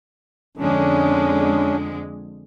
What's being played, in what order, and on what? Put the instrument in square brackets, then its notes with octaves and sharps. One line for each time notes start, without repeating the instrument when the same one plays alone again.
[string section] F2 D3 G#3 [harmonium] C#4 D4